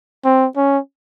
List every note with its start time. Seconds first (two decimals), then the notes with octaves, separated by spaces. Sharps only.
0.24 C4
0.56 C#4